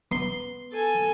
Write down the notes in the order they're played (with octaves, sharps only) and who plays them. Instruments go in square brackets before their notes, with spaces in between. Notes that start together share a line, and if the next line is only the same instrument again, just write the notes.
[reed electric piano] B3 [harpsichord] C6
[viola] A4 G#5